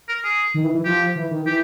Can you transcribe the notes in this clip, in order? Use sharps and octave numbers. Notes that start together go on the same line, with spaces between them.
A#4
G#4
D#3
E3
E3
F3 G4
E3
D#3
E3 G4